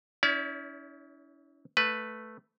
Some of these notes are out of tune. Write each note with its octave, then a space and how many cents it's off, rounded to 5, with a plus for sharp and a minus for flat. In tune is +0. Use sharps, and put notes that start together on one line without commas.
C#4 +25 E4 -30 D5 -40
A3 +0 B4 +0